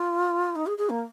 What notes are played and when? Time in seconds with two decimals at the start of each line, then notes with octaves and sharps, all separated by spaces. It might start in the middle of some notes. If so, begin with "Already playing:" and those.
Already playing: F4
0.56 D#4
0.67 G#4
0.78 G#4
0.90 A#3